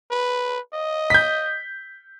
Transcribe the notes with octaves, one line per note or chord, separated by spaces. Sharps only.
B4
D#5
G6 B6